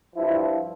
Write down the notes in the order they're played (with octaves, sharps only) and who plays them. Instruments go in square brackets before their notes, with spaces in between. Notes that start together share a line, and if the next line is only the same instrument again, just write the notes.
[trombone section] G2 F3 E4